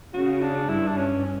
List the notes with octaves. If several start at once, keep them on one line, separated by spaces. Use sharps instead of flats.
C#3 F#4
D4
G2 E4
D4
C#4
C#4